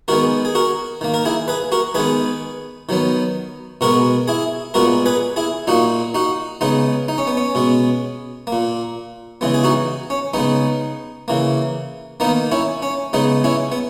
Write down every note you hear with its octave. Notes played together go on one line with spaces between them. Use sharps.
D#3 G#3 B3 F#4 A#4
G#4
F#4 A#4
D#3 A#3
A#4
E4 G#4
G#4 B4
F#4 A#4
D#3 G#3 B3 G#4 B4
D#3 F#3 B3
B2 G#3 B3 F#4 A#4
E4 G#4
A#2 G#3 B3 F#4 A#4
G#4 B4
E4 G#4
A#2 A#3 D#4 F#4
D#4 F#4
C#3 G#3 B3 D#4
D#4
C#4
B3
C#4
B2 G#3 B3
A#3
A#2
C#3 E3 G#3 B3
G#4
D#4 F#4
C#4
C#3 G#3 B3 D#4
C#3 E3 A#3
D#3 A#3 B3 D#4
C#4 E4
C#4
C#3 G#3 B3 D#4
C#4 E4
B3